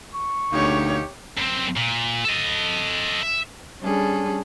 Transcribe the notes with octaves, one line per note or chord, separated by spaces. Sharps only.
C#6
D2 B2 A#3 D#4 G4 C#5
F#2 C4
A#2
A4 D#5
E5
G3 C#4 D4 G#4 A4